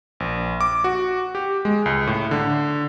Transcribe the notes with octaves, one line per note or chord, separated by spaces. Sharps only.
A#1
D6
F#4
G4
G#3
C#2
A2
D3